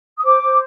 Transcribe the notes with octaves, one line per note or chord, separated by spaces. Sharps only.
D#6
C5 D6
C5